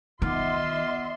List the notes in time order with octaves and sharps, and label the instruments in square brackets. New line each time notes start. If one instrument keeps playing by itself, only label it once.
[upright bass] D#3 [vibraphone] B3 F#5 D6 [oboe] F4 [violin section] D#5 E5 C6